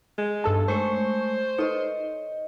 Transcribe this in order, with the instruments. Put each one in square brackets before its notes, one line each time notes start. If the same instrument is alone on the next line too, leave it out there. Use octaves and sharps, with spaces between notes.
[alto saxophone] G#3
[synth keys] G2 A4 A5 [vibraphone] D#4
[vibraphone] G#3 A3 C#5 [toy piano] A#4 [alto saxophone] C5 [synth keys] C#6
[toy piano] D#4 A4 B4 [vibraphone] C#5 D#5